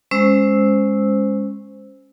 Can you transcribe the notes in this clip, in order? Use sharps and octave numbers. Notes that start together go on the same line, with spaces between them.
G#3 C#4 C5 E6